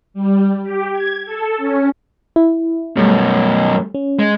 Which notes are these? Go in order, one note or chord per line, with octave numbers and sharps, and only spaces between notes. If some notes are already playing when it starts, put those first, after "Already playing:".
G3
G4
G#6
A4
C#4
E4
F#2 B2 G3 A3
C#4
G#3